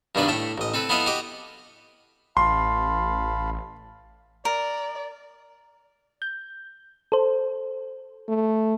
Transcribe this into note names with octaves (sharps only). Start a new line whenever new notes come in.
G2 B2 D#3 D4 B4 D5
A2 A3 G5 A5
A1 D#5
C4 A4 B4
B3 E4 F4 A4 D#5 F5
F#4 G4 D#5 D6
A1 F5 A5 B5 C6
A#4 D5
G6
A4 C5
A3